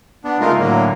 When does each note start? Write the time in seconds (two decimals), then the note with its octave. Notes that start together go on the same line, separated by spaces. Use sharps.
0.24 B3 D4
0.40 C#3 G#3 A3 D#4 F4 A#4
0.59 A2 D3 F#3 A#3